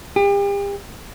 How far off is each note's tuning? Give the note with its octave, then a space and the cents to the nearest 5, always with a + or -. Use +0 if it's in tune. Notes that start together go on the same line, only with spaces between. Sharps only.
G4 +40